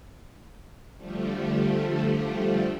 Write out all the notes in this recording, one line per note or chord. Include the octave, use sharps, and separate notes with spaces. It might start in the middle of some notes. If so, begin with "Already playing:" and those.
D3 F3 G3 A3